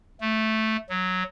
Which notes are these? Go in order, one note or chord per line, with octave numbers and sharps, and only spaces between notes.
A3
F#3